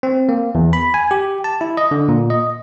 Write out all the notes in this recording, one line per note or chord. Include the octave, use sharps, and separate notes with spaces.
C4
A#3
E2
B5
G#5
G4
A5
E4
D#5
D3
A#2
D#5